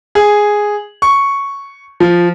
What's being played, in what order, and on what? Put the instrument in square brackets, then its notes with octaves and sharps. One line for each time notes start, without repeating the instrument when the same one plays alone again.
[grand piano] G#4
C#6
F3